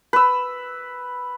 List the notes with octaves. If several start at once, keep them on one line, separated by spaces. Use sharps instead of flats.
B4 E6